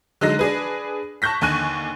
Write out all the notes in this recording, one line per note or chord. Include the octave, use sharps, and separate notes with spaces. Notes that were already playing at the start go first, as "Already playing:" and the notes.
D3 F#3 G#3 D#4 A#6
D4 G#4 B4
A5 C#6 F#6 G6 A#6 B6
D#2 D3 G#5 C#6 F#6 D#7